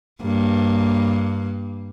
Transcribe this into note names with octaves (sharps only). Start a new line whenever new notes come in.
G2 A#3